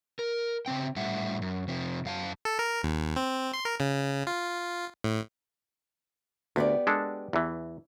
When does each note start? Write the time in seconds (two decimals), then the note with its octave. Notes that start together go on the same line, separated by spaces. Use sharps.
0.19 A#4
0.66 C#3 G3 C4 G5
0.96 A2 G3 E5 F#5
1.42 F#2
1.68 F2 C3 F3
2.05 F#2 F5 A5
2.45 A4
2.59 A#4
2.83 D#2
3.16 C4
3.53 C6
3.65 A#4
3.80 C#3
4.27 F4
5.04 A2
6.56 D2 B3 G4 D5
6.87 G#3 D4 A4
7.33 E2 E3